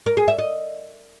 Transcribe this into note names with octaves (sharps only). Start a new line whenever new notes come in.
A#4
G#4
E5
D#5